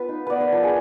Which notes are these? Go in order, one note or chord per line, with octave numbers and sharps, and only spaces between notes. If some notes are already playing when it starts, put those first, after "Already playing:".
Already playing: B3 F4 B4
D#4
B3 B4 D5
B4
F3 A#4
G#4